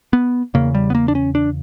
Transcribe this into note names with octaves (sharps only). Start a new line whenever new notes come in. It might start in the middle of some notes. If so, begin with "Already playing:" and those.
B3
E2 C#3 A#3
G3
B3
A#3
D4
C#4
D4